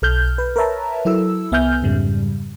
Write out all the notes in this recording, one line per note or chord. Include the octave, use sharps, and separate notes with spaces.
B1 A4 F6 G6
B4
A#4 B4 C#5 E5 A5 A#5
F#3 E4 A4 E6
C2 B3 E5 G#5 F6 G6
F2 G#2 C#3 G3